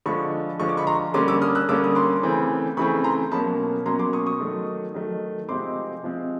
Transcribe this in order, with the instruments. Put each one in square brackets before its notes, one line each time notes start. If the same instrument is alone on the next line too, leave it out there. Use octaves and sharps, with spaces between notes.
[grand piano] D3 F3 G#3 B5 C#6
D3 F3 G#3 C#6
D6
B5 C#6
A#5 C6
D3 G3 A#3 C#4 C6 D6
D6 E6
D#6 F6
E6 F#6
D3 G3 A#3 C#4 D6 E6
D#6
C6 D6
C#3 E3 A3 C4
C#3 E3 A3 C4 B5 C#6
A#5 C6
B2 F#3 A#3 C#4 A5 B5
B2 F#3 A#3 C#4 A#5 C6
C6 D6
C#6 D#6
C#6 D#6
D#3 F#3 A3
D#3 F#3 A3
C3 F3 G#3 C4 C6 D6
C3 F3 G#3 C4